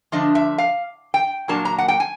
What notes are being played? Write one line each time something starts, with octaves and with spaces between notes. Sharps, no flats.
D3 F3 A3 D4 D#5
E5
F5
G5
A#2 F#3 A#3 D4 A5
A#5
F#5
G5
G#5